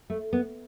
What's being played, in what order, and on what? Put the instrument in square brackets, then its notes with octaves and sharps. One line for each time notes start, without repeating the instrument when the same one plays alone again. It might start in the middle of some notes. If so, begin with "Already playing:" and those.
[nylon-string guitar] A3
B3